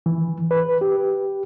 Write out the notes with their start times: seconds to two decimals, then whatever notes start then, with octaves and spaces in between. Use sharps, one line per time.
0.06 E3
0.51 B4
0.81 G4